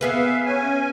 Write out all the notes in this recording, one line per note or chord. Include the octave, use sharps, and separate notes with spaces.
B3 G#4 B4 E5 F5
C#4 G#5